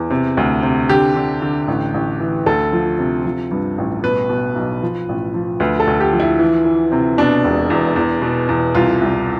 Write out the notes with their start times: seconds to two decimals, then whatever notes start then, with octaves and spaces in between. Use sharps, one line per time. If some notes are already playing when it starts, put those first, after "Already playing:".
Already playing: E2
0.10 C3
0.37 D2
0.63 C3
0.89 D3 G4
1.16 D3
1.42 D3
1.68 A1
1.94 A1
2.20 E3
2.46 D2 A4
2.73 F3
2.99 C3
3.25 F3
3.51 G2
3.78 A1
4.03 B2 B4
4.29 B2
4.55 B1
4.83 F3
5.09 A1
5.34 F3
5.60 D2 B4
5.80 A4
5.87 D2
6.00 G4
6.13 F3
6.20 E4
6.39 E3
6.65 E3
6.92 C3
7.18 B2 D4
7.44 E1
7.70 E2
7.96 E2
8.22 B2
8.49 E2
8.75 C2 F4
9.01 C2